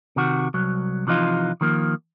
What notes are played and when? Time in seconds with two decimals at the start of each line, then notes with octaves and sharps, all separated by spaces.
0.16 C3 D#3 F#4
0.54 C2 F#3
1.07 C3 E3 F3 D#4 F4
1.61 D#3 F3 A#3